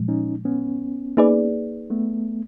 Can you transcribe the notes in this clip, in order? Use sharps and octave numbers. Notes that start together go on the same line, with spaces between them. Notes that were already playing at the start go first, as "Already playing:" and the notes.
Already playing: A#2 F3 G#3
C#4 D#4
B3 C#4
A#3 D#4 G#4 B4 D5
A3 B3